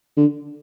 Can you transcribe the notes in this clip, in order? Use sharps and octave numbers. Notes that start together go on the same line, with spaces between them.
D3